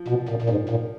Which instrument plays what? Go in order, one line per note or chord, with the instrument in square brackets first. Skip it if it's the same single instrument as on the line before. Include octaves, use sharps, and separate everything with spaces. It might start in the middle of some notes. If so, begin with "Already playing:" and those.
Already playing: [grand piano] F3
[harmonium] B2
A#2
A#2
G#2
A#2